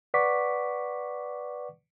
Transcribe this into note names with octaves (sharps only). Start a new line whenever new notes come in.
B4 D5 F#5 C#6 D6 B6